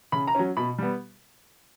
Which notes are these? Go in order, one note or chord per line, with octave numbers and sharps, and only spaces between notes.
C#3 B5
A#5
F#3 C#4
B2 B5
G3 B3